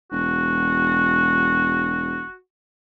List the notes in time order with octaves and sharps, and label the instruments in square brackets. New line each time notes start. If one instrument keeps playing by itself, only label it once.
[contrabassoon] E1 [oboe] F#4